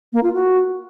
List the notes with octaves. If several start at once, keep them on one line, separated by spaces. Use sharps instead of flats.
A#3
F4
F#4